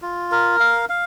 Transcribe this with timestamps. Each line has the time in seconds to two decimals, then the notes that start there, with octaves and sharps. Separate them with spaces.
0.02 F4
0.31 A#4
0.60 F5
0.89 F5